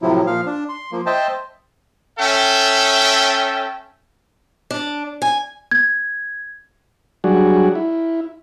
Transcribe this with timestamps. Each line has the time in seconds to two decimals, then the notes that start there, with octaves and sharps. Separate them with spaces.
0.02 A2 C3 F3 F#3 E4
0.27 A#2 F3 F5
0.46 D4
0.69 C6
0.92 F3 A#3
1.06 C5 D#5 E5 G5 A5
2.20 C#4 A4 E5 G5
4.71 D4
5.22 G#5
5.71 G#6
7.24 F#3 G3 D4 F#4 G#4
7.75 E4